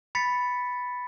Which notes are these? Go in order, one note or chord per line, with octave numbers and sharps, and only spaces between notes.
B5 A6 B6 C#7